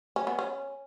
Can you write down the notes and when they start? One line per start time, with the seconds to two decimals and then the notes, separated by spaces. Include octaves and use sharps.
0.16 C#4
0.27 B3
0.39 C#4